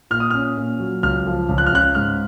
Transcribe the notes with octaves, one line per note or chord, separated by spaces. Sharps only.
A#2 F6
D#6
C#4 F6
A#2
F#3
C#2 F6
F3
C#2
F#6
F6
C#3 F#6
G#2 F6